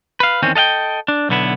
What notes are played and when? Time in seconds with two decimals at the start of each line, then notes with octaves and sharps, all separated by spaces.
0.20 B4 F5
0.43 E2 D#3 C4 C#4
0.55 A4 D#5 F5 G5
1.08 D4
1.29 B1 D3 B3 E4